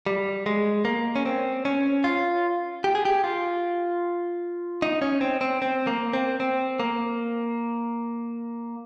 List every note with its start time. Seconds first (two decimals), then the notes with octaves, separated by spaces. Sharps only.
0.06 G3
0.46 G#3
0.85 A#3
1.16 C#4
1.25 C4
1.65 C#4
2.04 F4
2.84 G4
2.95 G#4
3.05 G4
3.24 F4
4.82 D#4
5.02 C#4
5.21 C4
5.41 C4
5.62 C4
5.87 A#3
6.13 C4
6.40 C4
6.80 A#3